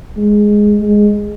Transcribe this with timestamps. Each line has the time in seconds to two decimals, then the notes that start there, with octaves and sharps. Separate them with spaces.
0.17 G#3
0.81 G#3